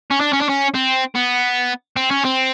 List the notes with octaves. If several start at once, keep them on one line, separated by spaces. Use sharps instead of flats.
C#4
D4
C#4
D4
C#4
C4
B3
C4
C#4
C4